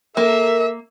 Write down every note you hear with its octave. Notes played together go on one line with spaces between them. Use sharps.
A#3 A4 A#4 E5